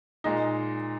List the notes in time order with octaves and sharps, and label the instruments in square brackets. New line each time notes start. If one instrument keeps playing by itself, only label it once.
[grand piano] A#2 G#3 D#4